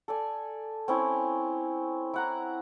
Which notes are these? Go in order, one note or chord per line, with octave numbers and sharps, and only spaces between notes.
A4 D5 G#5
C4 C#4 E4 C#5
E4 F#5 A#5